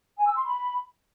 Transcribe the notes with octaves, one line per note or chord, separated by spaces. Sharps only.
G#5
E6
C6
B5